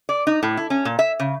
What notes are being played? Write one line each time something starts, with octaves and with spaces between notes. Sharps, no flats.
D5
D#4
A2
E4
C#4
A#2
E5
C#3